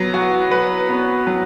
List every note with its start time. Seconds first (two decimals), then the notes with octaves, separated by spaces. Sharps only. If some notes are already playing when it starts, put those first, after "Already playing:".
Already playing: F#3 B3 B4
0.14 F#4
0.51 B4
0.89 B3
1.27 F#3